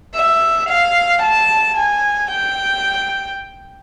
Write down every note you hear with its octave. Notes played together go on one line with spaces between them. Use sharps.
E5
F5
A5
G#5
G5